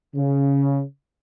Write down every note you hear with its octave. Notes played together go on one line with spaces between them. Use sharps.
C#3